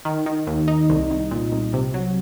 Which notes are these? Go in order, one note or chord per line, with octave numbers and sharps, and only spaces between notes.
D#3
D#3
D#2
D#4
C2
C2
A#2
C2
C3
F#3